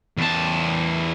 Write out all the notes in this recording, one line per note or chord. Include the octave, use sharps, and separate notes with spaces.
E2 A5